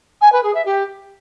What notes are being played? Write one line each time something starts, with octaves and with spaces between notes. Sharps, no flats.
G#5
B4
G#4
E5
G4